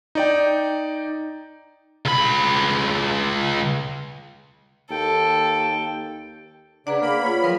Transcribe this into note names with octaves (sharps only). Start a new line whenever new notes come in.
D#4 D5 G5
C#2 B5
D#2 A4 G5
C#3 D4 G#4 B4 D5 F#5 A#5
A#3 B5
A#3 F4 C#5
F3 F#3 A#4 G5